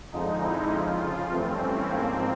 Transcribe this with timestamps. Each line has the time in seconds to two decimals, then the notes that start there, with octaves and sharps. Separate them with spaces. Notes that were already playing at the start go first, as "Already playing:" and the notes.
0.12 F2 D3 F3 G#3 D#4
0.41 E4
0.71 F2 C#3 F3 F4
1.01 F4
1.30 G2 E3 A3 C4
1.60 C#4
1.90 G#2 F3 A#3 C4